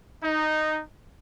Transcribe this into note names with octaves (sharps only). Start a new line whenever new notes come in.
D#4